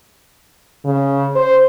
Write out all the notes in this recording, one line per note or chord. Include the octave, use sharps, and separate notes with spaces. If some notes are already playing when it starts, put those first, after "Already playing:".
C#3
C5